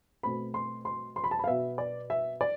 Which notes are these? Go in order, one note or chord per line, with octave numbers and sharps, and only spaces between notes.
B2 A3 C4 B5
C6
C6
C6
B5
A5
B5
F5
B2 B3 E5
D5
E5
D5